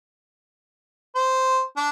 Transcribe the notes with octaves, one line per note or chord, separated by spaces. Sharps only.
C5
D4